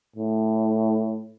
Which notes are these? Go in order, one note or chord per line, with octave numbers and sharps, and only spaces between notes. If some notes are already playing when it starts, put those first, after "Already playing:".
A2